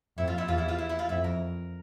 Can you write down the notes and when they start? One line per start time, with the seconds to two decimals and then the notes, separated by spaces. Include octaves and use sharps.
0.17 F2 E4 E5
0.27 F4 F5
0.38 E4 E5
0.48 E2 F4 F5
0.58 E4 E5
0.68 F4 F5
0.78 E4 E5
0.89 E4 E5
0.99 F4 F5
1.09 F2 E4 E5
1.24 A#4